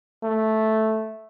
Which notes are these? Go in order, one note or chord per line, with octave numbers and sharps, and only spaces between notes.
A3